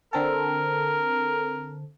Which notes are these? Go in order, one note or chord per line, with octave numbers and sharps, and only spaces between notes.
D3 C4 A4 A#4